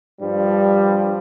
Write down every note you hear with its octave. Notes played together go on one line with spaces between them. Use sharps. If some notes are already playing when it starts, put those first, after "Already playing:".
G2 F3 G3